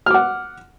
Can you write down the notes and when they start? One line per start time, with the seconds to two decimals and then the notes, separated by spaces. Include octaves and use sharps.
0.06 F6
0.10 D6
0.14 F#5